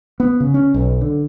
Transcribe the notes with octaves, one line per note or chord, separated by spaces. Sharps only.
B3
C#3
C#4
B1
D3